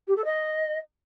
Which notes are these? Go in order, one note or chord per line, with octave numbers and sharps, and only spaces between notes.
G4
A4
D#5